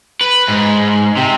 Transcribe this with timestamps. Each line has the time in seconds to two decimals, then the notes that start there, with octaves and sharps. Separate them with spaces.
0.21 B4
0.48 G#2
1.17 C3